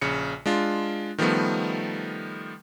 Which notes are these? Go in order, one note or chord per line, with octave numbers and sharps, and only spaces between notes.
A#1 C#3 C#7
G#3 D4 F4
D#3 F3 G3 A3 B3